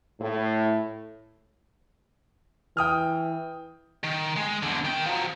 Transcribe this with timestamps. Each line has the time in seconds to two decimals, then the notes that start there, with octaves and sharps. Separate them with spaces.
0.20 A2
2.77 E3 G5 D#6 F6
4.03 D#3
4.36 G#3
4.63 E2 D3
4.85 D#3 G5
5.06 F3 F#3